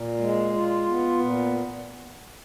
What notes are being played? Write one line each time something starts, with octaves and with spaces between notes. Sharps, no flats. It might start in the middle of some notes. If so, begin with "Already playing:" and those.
Already playing: A#2
G#3
F4
B3
A#2